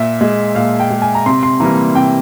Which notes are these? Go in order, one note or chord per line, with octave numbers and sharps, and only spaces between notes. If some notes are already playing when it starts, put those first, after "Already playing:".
Already playing: A#2 E5
G#3
A#2 F5
G5
G#3
G#5
A#5
C3 C6
C6
E3 G3 A#3 A#5
C3 G5